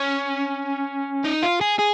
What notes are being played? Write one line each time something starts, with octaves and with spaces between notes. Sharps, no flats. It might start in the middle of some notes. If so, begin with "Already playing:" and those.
Already playing: C#4
D#4
F4
G#4
G#4